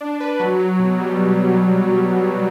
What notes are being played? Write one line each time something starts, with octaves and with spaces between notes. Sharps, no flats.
D4
B4
F#3
F#3
B2
G3